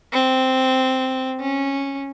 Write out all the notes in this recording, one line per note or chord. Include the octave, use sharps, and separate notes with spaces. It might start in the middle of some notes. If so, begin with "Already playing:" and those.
C4
C#4